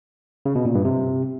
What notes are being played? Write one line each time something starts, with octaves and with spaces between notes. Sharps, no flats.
C#3
B2
A#2
G2
C3